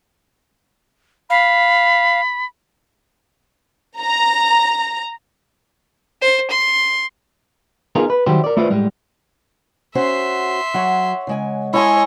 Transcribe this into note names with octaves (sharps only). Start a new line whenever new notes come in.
F5 B5
A#5
C5
C6
B3 D#4 F4 G#4 A#4
B4
D#3 F#3 G3 E4 G4 C5
A#4 D5
A3 E4 F4 B4 C5 D5
A2 G3 G#3
C#4 F#4 C5 E5 C6
F#3 C#5 F#5
C#3 G#3 G#5
G#3 E4 C#5 D#5 G#5 A5 C6